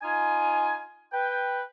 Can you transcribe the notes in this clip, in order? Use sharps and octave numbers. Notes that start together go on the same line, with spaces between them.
D#4 F4 G#5
B4 G5